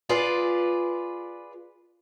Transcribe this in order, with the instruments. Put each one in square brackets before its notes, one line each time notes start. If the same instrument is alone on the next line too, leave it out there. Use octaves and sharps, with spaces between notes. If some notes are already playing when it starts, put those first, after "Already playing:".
[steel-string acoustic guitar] F4 G#4 B4 D5